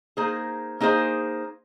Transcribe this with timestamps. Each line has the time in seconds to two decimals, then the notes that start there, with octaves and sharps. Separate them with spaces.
0.17 A#3 D#4 G#4 C5
0.80 A#3 D#4 G#4 C5